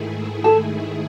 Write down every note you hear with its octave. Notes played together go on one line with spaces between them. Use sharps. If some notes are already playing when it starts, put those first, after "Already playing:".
Already playing: G#2 D#3 A3 E4 G#4
A4